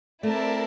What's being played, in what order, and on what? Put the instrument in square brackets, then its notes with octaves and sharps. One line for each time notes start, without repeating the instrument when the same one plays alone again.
[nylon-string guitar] A3 [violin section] C4 E4 A#4 D5 A5